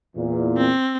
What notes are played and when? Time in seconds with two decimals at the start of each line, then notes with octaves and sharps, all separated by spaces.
0.16 E2 A#2
0.57 C4